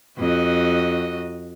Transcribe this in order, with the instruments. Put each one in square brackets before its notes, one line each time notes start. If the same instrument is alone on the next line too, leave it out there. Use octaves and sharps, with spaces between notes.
[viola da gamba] F2 F#4 D#5